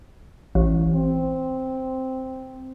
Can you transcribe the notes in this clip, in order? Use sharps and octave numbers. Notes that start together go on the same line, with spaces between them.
A1
C4